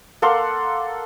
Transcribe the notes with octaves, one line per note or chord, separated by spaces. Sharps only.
A#3 A4 F#5 C6